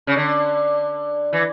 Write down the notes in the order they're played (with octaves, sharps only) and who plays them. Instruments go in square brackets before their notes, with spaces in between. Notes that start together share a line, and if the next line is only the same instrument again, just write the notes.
[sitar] C#3
D3
E3